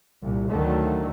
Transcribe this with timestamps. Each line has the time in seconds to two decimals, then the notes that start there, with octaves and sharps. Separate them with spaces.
0.22 C2 A#2
0.51 D2 D3 D#3 F#3 A3